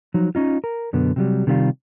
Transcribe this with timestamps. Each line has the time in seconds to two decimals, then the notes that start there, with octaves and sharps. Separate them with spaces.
0.14 F3 F#3 D#4
0.35 C#4 D#4 F4
0.64 A#4
0.93 F#2 B2 D3 B3
1.16 C3 F#3 G3
1.47 C3 D#3 G3 D4 F4